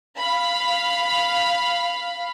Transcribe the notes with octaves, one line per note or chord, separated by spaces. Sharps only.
F5 B5